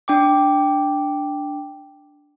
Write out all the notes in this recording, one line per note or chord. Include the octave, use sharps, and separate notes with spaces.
D4 G5 D6